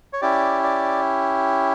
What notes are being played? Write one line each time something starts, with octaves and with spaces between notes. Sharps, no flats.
C#5
C#4 E4 G4 D5
D5